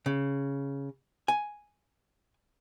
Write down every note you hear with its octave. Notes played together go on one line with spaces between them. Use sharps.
C#3
G#5